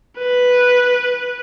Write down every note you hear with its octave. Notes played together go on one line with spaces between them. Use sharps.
B4